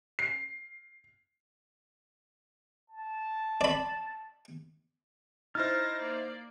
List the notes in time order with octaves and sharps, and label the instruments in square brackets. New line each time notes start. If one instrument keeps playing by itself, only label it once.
[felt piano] C7
[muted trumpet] A5
[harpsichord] D5 B5
[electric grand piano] D#4 E4 C5 [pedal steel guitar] F6 [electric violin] A6 A#6
[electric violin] A#3 D5